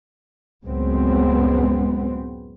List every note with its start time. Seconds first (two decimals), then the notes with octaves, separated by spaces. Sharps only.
0.64 C#2 F#2 A2 G#3 B3 C4